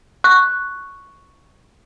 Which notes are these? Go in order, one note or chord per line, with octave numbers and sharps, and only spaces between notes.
C#6 F#6